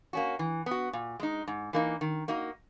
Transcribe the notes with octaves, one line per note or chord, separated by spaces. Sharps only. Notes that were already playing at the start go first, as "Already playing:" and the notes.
A#3 C#4 F#4
E3
B3 F#4
A#2
G#3 D#4
G#2
E3 A#3 D#4
D#3
A#3 D#4 F#4